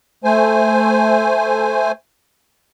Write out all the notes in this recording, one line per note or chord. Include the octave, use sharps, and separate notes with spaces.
A3 C5 G#5